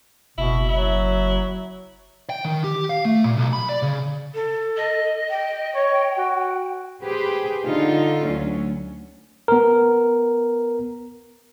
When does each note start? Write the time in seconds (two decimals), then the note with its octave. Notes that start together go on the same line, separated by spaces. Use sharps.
0.38 F#1 B2 E4
0.69 F#3 E4
2.30 G5
2.45 D#3
2.64 G4
2.90 F5
3.05 A3
3.24 A#2
3.37 B1
3.53 B5
3.69 D5
3.83 C#3
4.35 A4
4.77 D#5
5.30 G5
5.75 C#5
6.18 F#4
7.03 G4 G#4 B4 C5
7.65 D3 D#4 F4 A4
8.26 D2 F#3 C#4
9.48 B3 A#4